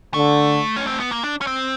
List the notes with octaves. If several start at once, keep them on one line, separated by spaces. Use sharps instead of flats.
D3 A3
C#4
C4
B3
A#3
D4
C#4
C4